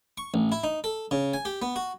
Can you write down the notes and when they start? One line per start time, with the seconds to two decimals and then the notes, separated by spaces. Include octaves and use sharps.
0.18 C#6
0.34 A1
0.52 E4
0.64 D#4
0.84 A4
1.11 C#3
1.34 G#5
1.45 G4
1.62 B3
1.76 F#4